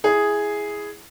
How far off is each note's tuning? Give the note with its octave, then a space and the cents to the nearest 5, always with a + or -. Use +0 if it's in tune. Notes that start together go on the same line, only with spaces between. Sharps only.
E4 +0 G#4 +0